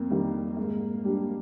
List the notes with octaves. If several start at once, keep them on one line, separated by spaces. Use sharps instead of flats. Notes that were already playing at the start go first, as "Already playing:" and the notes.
Already playing: F2 A#3
D#3 G3
G#2
G3 D4 G4